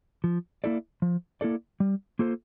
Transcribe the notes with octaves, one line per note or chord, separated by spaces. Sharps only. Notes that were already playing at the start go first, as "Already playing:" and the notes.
F3
A#3 E4 A4 D5
F3
A#3 E4 A4 D5
G3
A#3 F4 A4 C5